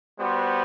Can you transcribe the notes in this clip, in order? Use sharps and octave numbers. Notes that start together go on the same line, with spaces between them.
G3 B3 F#4 C5